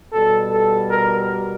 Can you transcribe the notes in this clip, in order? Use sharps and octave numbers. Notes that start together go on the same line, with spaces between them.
B2 G3 A4
A4
A#4